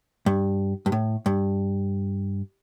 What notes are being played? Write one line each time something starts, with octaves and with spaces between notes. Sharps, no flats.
G2
G2
A2
G2